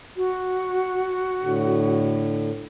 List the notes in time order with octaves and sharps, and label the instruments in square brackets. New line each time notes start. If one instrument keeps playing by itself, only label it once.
[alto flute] F#4
[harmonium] A2 D3